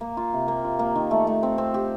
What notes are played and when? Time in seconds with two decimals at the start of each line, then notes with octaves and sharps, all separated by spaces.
0.01 A#3
0.17 F4
0.33 C3
0.48 A#3
0.64 F4
0.79 A#3
0.95 D#3
1.11 A3
1.27 A3
1.43 C4
1.58 C4
1.74 G4